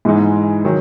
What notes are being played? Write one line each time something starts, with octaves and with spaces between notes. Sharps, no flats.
G#2 E3 G#3 D#4
D#3 F#3